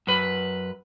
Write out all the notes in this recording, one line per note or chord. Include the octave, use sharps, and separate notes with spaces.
F#2 B4